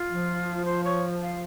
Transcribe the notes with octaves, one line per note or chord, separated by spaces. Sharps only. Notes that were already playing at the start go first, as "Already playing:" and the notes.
Already playing: F4
F3
C5
C#5
F5